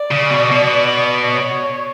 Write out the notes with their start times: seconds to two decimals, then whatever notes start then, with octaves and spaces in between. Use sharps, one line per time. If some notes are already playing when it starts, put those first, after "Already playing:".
Already playing: D5
0.11 C#3
0.31 B2
0.52 B2
1.33 C#5